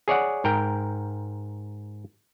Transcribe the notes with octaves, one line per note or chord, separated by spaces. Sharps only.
G#4 C#5 D5 F#5
G#2 A#4 G5